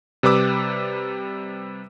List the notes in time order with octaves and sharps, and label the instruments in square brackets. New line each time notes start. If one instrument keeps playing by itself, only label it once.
[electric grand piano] C3 G3 B4 D6 E6